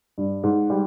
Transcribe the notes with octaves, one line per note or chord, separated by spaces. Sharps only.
G2
G#2
G3